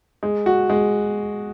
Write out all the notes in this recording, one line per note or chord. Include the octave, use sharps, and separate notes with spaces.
G#3
F#4
G#3